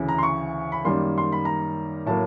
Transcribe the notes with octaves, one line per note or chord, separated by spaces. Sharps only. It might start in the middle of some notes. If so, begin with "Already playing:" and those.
Already playing: D2 C#3 E3
A#5
C6
C#6
B5
F#2 D#3 G3 A#3 C6
C6
B5
A#5
A2 F#3 A#3 A5